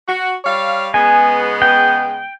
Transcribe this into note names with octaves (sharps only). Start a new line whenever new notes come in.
F#4
G3 C#5 F5
C#3 G#3 B3 G#5
G5